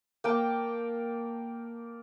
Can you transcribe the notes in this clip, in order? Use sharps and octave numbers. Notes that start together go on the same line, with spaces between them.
A#3 G5 A5